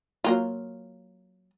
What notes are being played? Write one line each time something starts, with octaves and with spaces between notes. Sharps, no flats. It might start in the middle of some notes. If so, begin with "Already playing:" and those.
F#3 A#3 F4